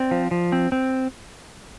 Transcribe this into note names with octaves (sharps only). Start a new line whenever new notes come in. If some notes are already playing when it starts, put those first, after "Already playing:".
Already playing: C4 D5
F3
F3
C4
C4